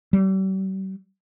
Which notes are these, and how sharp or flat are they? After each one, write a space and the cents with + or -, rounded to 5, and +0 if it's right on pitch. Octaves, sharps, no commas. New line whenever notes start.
G3 -45